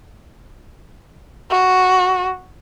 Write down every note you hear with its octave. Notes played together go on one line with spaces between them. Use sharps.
F#4